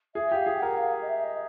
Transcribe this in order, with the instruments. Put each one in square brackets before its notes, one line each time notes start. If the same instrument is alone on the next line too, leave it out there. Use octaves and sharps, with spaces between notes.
[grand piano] G#4 [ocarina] E5
[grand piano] G4 [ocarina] F5
[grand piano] G#4
[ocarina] F#5
[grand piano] A#4
[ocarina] F5
D#5
E5
D#5